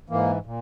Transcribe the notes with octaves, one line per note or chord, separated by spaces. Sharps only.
G#2 E3 A#3
A#2